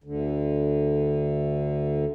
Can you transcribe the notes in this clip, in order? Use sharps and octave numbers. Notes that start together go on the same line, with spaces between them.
D2 D3